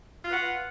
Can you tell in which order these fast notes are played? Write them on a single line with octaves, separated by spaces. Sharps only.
F4 B4 F#5